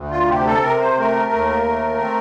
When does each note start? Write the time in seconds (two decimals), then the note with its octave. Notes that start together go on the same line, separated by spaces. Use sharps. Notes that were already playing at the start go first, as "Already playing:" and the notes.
Already playing: D2
0.11 F4
0.28 C3 G4
0.46 A4
0.62 C3 A#4
0.80 C5
0.98 A3 A#4
1.32 D#2
1.66 A3
2.02 C4